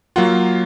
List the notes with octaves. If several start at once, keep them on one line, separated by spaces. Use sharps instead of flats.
F#3 A#3 F4 F#5